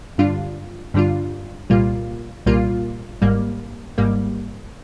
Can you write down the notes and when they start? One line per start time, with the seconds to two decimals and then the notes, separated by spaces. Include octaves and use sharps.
0.18 G2 D3 G3 D4 F4
0.94 G2 D3 G3 D4 F4
1.70 C2 A#2 G3 A#3 F4
2.46 C2 A#2 G3 A#3 F4
3.22 G#1 G#2 G3 A#3
3.98 G#1 G#2 G3 A#3